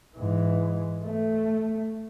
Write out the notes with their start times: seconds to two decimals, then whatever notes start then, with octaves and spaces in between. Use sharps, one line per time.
0.17 G#2 E3
1.05 A3